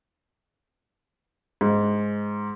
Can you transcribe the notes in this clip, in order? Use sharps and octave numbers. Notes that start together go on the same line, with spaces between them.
G#2